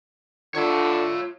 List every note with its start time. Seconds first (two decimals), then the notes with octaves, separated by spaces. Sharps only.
0.55 D3 F4 C#5 E5